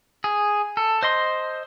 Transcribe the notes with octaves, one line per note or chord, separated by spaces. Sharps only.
G#4
A4
C5 D#5 C6